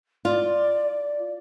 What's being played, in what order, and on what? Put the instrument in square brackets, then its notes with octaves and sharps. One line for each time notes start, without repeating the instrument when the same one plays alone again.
[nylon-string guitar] F4 [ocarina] D5